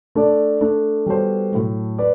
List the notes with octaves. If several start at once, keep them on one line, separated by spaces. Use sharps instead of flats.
A3 D4 A4 D5
A3 D4 A4
G3 B3 F#4 A4 C5
A2 F#3 A3
B4 D5